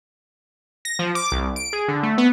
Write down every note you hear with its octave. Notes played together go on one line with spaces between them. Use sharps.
A#6
F3
D6
C2
D7
G#4
D3
A3
B3